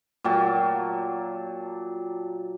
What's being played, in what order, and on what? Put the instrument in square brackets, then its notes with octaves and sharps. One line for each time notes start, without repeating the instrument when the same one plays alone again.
[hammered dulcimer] A#2 F#3 G5 A5